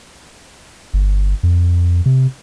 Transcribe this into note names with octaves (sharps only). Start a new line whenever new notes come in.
G1
F2
C3